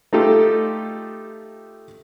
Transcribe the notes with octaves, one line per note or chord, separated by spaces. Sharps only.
A3 D#4 F4 G4 A4